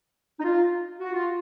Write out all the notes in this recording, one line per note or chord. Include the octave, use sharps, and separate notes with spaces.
D#4
F4
F#4
F4